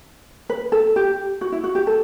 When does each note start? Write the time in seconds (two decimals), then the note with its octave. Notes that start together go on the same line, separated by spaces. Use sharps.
0.50 B4
0.72 A4
0.96 G4
1.41 F#4
1.52 E4
1.64 F#4
1.75 G4
1.87 A4